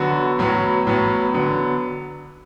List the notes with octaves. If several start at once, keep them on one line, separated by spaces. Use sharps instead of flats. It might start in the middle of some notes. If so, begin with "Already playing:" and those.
Already playing: D3 F#3 B3 F#4
A2 F#3 B3
A2 F#3 B3
D3 F#3 B3